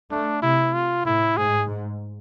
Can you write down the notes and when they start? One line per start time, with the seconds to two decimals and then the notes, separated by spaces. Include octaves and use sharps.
0.11 A3 D4
0.42 C3 E4
0.74 F4
1.05 A2 E4
1.37 G#2 G#4
1.68 G#2